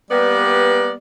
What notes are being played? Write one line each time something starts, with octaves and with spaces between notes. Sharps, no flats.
G3 A#3 B3 G4 B4 D5